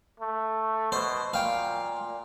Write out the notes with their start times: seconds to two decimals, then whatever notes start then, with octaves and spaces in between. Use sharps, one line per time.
0.20 A3
0.92 B2 C5
1.34 A#2 F5 G5